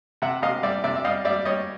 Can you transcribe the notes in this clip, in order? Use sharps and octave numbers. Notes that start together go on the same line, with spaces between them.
C3 E5 F#5
C3 D#5 F5
G3 D5 E5
C3 D5 E5
E5
G3 D#5 F5
G3 D5 E5
G3 C#5 D#5